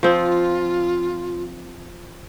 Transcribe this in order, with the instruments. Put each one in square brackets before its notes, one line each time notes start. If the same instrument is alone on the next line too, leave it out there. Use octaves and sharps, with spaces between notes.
[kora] F3 C4 [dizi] F4